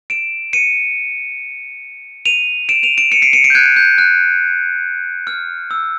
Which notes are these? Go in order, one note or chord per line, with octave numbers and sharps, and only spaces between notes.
D7 E7
C#7 D#7
D#7 F7
D7 E7
D#7 F7
D7 E7
C#7 D#7
C7 D7
C#7 D#7
C7 D7
G6
F#6 G#6
G6
F#6
F6
E6